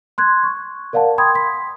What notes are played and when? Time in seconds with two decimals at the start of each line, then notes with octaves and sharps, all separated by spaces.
0.18 C6 F#6 G#6
0.43 C#6
0.93 A#4 D5 F5 F#5 A5
1.18 G5 B5 C6 D#6 G#6
1.35 C6 B6